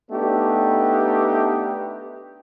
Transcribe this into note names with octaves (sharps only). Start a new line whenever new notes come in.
A3 B3 D4 D#4 G4 B4